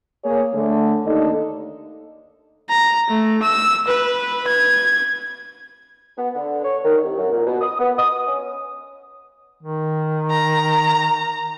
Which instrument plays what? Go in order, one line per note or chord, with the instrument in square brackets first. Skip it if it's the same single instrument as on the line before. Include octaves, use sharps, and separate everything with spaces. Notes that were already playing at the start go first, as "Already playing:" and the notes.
[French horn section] A#3 G#4 C#5
D3 A3
D#2 D4 D#4 A4 D#5
[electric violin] A#5
A3
E6
B4
G#6
[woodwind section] B3
D3
C#5
D#3
C2
F#2
A#2
B2
D#6
B3
D#6
C#4
[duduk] D#3
[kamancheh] A#5